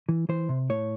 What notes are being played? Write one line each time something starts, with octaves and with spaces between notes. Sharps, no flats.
E3
E3 C5
C3
A2 C#5